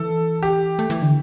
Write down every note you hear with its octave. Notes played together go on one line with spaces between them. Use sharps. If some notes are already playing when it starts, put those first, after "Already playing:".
Already playing: E3 A4
G4
A3
E3
D3